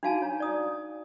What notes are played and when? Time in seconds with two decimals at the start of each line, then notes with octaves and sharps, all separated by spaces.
0.03 D4 D#4 F#4 F5 G#5 A5
0.22 C#5 A#5
0.40 D5 D#6